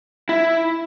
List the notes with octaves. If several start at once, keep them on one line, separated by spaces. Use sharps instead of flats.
E4